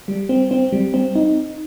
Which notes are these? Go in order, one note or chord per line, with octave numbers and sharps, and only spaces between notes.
G3
C4
C4
G3
C4
D#4